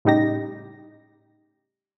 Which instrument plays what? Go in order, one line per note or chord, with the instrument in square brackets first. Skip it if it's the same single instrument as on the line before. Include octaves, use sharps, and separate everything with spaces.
[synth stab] A2 C#3 G3 D#4 G4 A#6